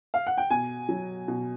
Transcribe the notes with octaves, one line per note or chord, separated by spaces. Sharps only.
F5
F#5
G5
B2 G#5
F#3
B2